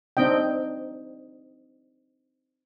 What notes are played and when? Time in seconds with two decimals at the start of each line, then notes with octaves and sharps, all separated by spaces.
0.17 C4 D4 D#4 D#5 G5